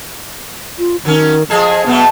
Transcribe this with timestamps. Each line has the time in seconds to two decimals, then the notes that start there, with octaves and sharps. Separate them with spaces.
0.79 F4
1.05 D#3 F#3 C#4
1.50 F3 G#4 A4 D#5
1.86 B2 F#3 A3 B3